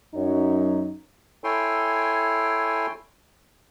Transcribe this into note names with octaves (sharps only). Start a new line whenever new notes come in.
F#2 F#3 D#4 C#5
E4 A4 C#5 G5 G#5 C6